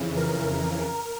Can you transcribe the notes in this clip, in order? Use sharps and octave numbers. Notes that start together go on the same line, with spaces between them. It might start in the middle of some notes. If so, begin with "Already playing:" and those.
Already playing: F2 C#3 E3
A#4